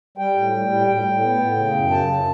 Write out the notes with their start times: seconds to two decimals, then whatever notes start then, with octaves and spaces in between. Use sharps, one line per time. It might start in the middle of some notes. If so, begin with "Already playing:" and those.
0.18 G3 G5
0.35 A2
0.53 G3
0.70 A2
0.87 A2 G5
1.04 A2
1.21 B3
1.39 A2
1.56 C#3
1.73 F#2
1.90 C#3 A5
2.08 F#2